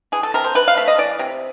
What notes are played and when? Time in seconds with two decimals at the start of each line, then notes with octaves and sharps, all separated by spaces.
0.12 E3 G#4
0.23 A4
0.34 C3 A#4
0.44 C5
0.55 C3 B4
0.68 F5
0.77 A3 E5
0.88 D#5
0.98 E3 D5
1.19 C3